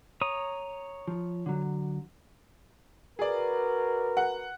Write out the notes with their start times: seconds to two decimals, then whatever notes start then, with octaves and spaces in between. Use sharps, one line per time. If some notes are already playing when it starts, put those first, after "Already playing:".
0.21 C#5 A#5 D#6
1.08 F3
1.46 D3 F#3
3.19 F#4 G#4 A#4 B4 D5
4.17 F#5